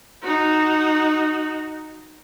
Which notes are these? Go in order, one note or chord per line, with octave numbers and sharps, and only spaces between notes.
D#4 F#4